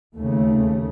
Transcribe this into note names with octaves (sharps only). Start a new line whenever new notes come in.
D#2 C#3 A3